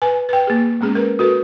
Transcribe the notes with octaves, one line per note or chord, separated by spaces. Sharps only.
B4 G#5
B4 G5
A#3 G#4
G#3 B3 C#4 G#4
A#4 B4
F#4 A4 B4